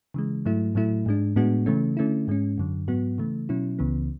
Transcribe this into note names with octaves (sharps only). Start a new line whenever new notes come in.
C#3 E3 G#3
G#2 F#3 A3 E4
A2 F#3 A3 E4
G#2 G#3 D4
A2 G#3 B3 D4 F#4
C#3 E3 A3 C#4
D3 A3 C#4 E4
G#2 G#3 C#4
F#2 D3 F#3
G#2 F#3 B3 F#4
C#3 E3 A3
B2 F#3 C#4 E4
C#2 C#3 E3 B3